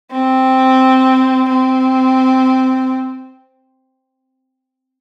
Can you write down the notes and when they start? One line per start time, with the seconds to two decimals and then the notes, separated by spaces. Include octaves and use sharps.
0.12 C4
1.49 C4